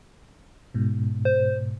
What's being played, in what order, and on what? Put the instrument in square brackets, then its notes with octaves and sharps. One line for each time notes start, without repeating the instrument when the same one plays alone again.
[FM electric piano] G#2 B2
[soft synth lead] C5